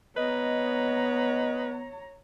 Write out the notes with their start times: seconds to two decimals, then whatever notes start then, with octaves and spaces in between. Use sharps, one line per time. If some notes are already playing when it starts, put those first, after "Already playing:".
0.17 B3 B4 C#5 D#5 A#5